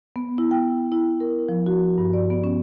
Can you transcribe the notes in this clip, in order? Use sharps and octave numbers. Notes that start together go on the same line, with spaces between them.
B3
E4
G5
E4
A#4
F3
F#4
G2
D5
B3
C#4